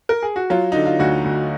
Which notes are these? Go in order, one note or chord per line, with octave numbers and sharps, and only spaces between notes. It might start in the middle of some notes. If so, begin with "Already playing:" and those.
A#4
G#4
F#4
F#3 F4
D3 D#4
F4
D2 F#4
D2